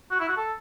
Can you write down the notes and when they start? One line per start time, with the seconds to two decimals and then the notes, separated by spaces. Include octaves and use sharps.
0.11 F#4
0.20 E4
0.28 F#4
0.37 A4